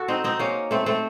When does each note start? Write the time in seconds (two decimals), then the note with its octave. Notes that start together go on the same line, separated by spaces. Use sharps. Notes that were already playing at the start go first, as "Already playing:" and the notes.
Already playing: F#4 A4
0.08 C4 D#4
0.24 C4 D#4
0.39 A#3 C#4
0.71 A3 C4
0.86 A3 C4